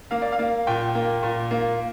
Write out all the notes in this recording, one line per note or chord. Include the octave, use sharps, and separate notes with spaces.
A#3 F5
D5
F5
A#3
A#2 G5
A#3
A#2
A#3